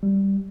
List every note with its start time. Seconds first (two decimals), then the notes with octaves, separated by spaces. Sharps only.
0.03 G3